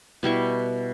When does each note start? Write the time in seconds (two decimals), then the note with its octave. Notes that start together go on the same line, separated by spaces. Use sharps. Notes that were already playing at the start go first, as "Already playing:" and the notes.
0.23 B2 G3 E4 C#6